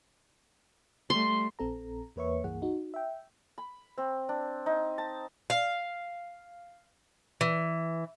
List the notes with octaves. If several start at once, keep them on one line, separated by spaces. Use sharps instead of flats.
G3 A3 C6
A#1 C4 A4 A#5
E2 A#3 B4 C#5 E5 C#6
C#2 G2 E3 A#3 G#4 F#5
D#4 F#4
E5 G5
B5
C4
D4
D#4
A5
F5
E3